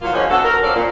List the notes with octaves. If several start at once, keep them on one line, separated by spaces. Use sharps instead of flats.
E3 F#3 A#3 F4
D3 E3 F3 G#3 A#3 C#4
B3 D4 F#4 A4
A#4
F3 C4 C#4 A4 D5
A#2